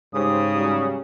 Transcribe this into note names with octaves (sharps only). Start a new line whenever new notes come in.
G#2 C#3 G4 C5 D#6
F#3 G3 C#4